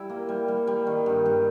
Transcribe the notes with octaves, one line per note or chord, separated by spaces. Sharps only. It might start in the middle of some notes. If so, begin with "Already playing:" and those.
Already playing: G3 E4
A#3
G3
G3
G3
D#3
G2
G2